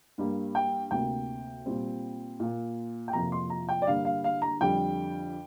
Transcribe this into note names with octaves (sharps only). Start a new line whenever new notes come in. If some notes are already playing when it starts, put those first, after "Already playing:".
G2 G3 A#3
G5
D2 C3 A#3 G5
A#2 G3 C4
A#2 A#3
G5
F2 C3 F3 A#3 A#5
C6
A#5
G5
D5
G2 D3 G3 A#3 F5
F5
F5
A#5
F2 D3 G3 G5